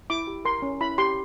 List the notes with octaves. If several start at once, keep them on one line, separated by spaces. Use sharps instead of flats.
E4 D6
G4
A#4 C6
C#4
E4 B5
G4 C6